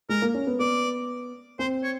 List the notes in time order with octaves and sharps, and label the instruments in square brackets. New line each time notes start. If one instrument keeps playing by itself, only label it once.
[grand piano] G#3 [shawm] A#4
[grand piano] A#3
C#4
B3
[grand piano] B3 [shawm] D5
[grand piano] C4 [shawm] C5
[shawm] C#5